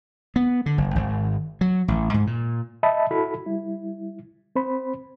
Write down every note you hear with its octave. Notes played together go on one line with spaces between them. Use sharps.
B3
D3
F#1
G#1
F#3
A1
G#2
A#2
D#5 E5 A5 B5
E4 F#4 A4 B5
G3 E4
C4 C5 B5